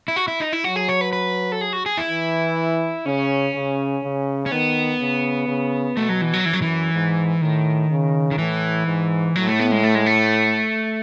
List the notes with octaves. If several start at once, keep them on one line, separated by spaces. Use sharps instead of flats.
E4
F#4
E4
D#4
E4
F#3 F#4
G#4
C#5
B4
B4
A4
G#4
F#4
G#4
E4
E3
C#3 C#4
C#3
C#3
C#4
D#3 B3
C#3
C#3
B2 A3
F#3
E3
F#3
F#2 E3
F#3
E3
G#2
A2 D#3
C#3
D#3
A2 E3
G#2
A2 F#3
A3
B3
G#3
A3
G#3
A3